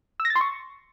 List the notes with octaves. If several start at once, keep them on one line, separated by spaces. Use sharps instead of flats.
E6
A#6
A6
C6
C#6